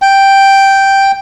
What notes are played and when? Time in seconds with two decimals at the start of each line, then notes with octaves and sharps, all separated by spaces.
0.02 G5